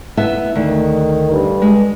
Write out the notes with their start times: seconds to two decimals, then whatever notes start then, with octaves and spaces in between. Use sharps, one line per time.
0.17 B3 E4 E5
0.55 D2 D#3
1.32 G2
1.62 G#3